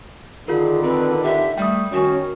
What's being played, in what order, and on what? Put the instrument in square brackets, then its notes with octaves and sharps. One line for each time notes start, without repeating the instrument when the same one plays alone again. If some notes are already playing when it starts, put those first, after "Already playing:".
[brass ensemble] D3 D#3 [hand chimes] F4 A#4 [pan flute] G#4
[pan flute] C4 [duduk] B4
[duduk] G4 [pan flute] E5
[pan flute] G3 [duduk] A3 [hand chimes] G5 D#6
[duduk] D#3 [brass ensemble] C#4 [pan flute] F#4